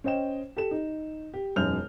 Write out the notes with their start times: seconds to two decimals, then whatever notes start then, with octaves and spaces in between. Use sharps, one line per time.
0.04 C#4 C5 D#5 G5 E7
0.57 G4 A4 E7
0.71 D#4
1.34 G4
1.56 E1 F#2 D#4 F6 G6 F7